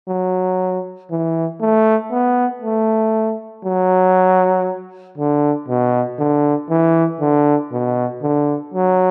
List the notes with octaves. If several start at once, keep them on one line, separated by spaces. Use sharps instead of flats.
F#3
E3
A3
B3
A3
F#3
D3
B2
D3
E3
D3
B2
D3
F#3